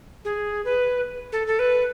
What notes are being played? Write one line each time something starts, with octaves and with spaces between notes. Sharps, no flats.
G#4
B4
A4
A4
B4